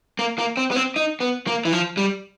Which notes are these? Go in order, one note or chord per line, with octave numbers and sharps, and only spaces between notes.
A#3
A#3
C4
B3
C4
D#4
B3
A#3
E3
F3
G3